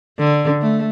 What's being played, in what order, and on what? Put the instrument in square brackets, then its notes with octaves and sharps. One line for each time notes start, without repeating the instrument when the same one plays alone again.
[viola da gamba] D3
A3